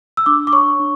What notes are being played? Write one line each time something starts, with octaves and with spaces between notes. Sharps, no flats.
E6
D4 D6
D6
C#5 C#6
D4